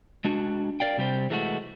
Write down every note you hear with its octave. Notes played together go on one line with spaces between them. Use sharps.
G#3 D4 F#4
A#4 D5 F5 G5
C3 G3 G4 C5
E3 G#3 A3 D#4 F#4